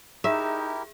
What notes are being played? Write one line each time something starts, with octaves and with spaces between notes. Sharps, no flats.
D#4 E4 G4 G#4 A#4 E5